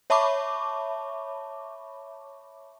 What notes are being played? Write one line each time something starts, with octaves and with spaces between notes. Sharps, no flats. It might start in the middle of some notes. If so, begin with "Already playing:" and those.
C#5 E5 A5 B5 C#6 D6